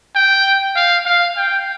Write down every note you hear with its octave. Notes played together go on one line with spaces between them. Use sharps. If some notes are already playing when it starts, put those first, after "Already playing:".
G5
F5
F5
G5